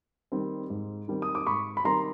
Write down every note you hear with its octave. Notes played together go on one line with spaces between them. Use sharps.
D#3 G3 C4
G#2
D#3 G3 C4
D#6
D6
G#2 B5 C#6
B5
D#3 G3 C4 A#5 C6